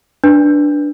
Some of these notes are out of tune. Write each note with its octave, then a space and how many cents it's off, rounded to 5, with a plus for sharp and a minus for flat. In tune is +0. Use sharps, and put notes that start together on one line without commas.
D4 +0 B4 -10